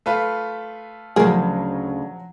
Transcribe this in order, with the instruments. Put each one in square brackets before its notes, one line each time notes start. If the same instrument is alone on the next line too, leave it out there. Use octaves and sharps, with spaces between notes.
[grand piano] A3 F4 B4
[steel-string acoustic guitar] D2 C#3 [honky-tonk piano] F3 F#3 [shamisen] G#4 A#4